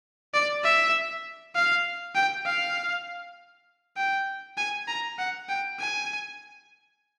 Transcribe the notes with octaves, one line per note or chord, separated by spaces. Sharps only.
D5
E5
F5
G5
F5
G5
G#5
A#5
F#5
G5
G#5